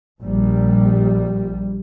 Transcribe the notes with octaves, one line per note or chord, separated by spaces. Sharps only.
A#1 G3